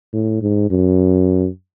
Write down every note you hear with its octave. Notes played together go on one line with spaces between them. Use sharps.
A2
G#2
F#2